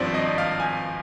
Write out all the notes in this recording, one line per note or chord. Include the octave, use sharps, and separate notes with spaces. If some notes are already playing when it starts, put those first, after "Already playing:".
Already playing: G#1 G2 F3 C4 C5 D5
D#5
F5
G#5